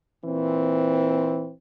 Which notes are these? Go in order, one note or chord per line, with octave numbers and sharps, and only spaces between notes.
A#2 E3 C4